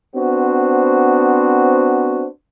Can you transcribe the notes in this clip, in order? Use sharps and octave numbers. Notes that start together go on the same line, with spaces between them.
B3 C4 D4 F#4 C5